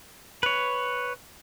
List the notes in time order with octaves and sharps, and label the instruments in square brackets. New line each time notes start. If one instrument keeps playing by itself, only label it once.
[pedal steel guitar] B4 C#5